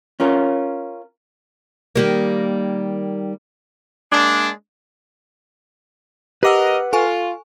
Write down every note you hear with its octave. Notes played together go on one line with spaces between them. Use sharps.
C#4 F4 A#4
D#3 G3 A#3
G#3 A#3 D4
G4 A#4 B4 D#5 F#5 D6 E6
F4 A4 G#5 C#6